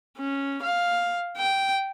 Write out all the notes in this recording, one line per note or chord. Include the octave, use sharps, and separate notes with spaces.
C#4
F5
G5